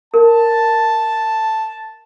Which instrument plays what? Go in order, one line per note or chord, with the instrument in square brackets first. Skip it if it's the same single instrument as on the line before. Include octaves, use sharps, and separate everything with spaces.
[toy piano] A#4 [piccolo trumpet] A5